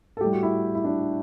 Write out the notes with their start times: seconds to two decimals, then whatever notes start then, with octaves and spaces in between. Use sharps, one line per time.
0.17 A4
0.21 A2 G3 G4
0.32 F#4
0.43 E4
0.75 E4
0.84 D4